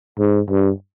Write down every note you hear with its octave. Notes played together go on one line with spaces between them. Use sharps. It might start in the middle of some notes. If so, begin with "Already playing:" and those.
G#2
G2